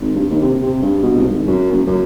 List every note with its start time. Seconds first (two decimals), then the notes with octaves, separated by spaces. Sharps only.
0.01 G#1
0.15 G2
0.30 D#2
0.42 C3
0.62 C3
0.82 G2
1.03 B2
1.17 C2
1.29 G#1
1.47 F#2
1.72 F#1
1.87 F#2